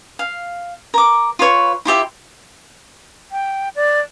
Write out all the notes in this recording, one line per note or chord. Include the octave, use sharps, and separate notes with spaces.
F5
A#4 D6
F4 B4 C#5 C#6
E4 F4 G4 E5
G5
D5